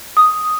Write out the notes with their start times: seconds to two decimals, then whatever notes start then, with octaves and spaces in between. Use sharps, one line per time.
0.17 D#6